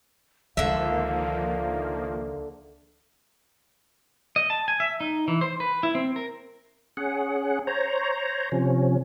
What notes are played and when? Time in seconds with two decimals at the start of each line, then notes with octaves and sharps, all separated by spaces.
0.57 C#2 D3 D#3 F3 A#3 E5 F5
4.36 D#5
4.50 A5
4.68 G#5
4.80 E5
5.01 D#4
5.28 E3
5.41 C5
5.60 B4
5.83 E4
5.95 C4
6.16 A#4
6.97 C#4 G#4 F#5
7.67 C5 C#5 A#5
8.52 C3 F3 C#4